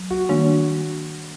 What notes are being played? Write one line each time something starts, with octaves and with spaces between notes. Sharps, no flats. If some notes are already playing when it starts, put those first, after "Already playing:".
Already playing: F#3
F#4
D#3 G3 A#3 D4